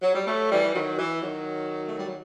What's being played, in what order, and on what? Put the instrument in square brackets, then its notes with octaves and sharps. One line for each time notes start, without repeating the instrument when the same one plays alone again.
[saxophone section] F#3
G3
F#3 A3
E3 G3
E3
D#3 F#3
E3
D#3 F#3
A3
G3
F#3